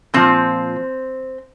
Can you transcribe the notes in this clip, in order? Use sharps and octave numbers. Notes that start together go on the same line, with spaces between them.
A#2 F3 C4